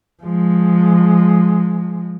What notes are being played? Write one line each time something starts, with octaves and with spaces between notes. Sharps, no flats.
F3 G#3